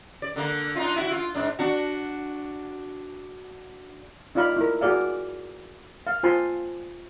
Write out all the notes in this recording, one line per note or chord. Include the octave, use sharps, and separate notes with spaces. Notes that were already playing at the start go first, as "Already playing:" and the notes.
D5
D3 A#3
D4 D#4 F4
E4 F#4
F4
G#2 D4
D4 F#4
D#4 F4 D5 F5 B5
E4 A#4
F#4 G#4 D5 F5
F5
F4 C5 G#5 A5 C6